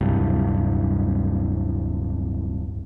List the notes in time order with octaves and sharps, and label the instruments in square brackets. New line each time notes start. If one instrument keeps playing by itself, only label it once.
[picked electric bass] D1 C2 G2